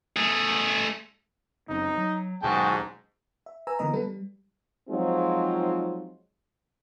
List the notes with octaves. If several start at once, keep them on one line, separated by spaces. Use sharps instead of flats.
A3 G#4
F#1 F#2 C4 D#4
F#3
D#2 G#2 B2 F#3 F#4 G#4 G5 A5
E5
B4 G#5 A#5 E6
D3 E3 A#3 B3 D#5 A#5
G3 B3 A4 B4
G3
F3 F#3 G#3 C4 D#4 F4